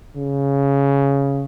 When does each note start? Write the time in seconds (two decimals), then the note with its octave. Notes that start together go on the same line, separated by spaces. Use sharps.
0.17 C#3